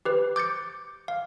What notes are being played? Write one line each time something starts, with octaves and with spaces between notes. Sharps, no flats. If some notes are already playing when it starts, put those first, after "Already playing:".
G4 B4 C5
D6 G6 A6 C#7
F5